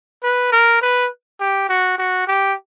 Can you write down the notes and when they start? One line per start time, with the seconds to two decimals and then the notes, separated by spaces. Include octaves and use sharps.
0.23 B4
0.52 A#4
0.81 B4
1.40 G4
1.69 F#4
1.98 F#4
2.27 G4